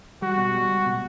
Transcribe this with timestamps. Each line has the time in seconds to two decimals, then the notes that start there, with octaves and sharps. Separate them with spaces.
0.22 G3 F#4
0.38 B2
0.54 G3
0.69 C#2
0.86 B2